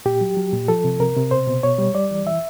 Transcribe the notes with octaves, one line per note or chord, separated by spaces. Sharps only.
A#2 G4
F#3
F#3
A#2
F3 A4
C3
C3 A#4
C3
B2 C5
B2
B2 C#5
G3
G3 D5
E3
E3 E5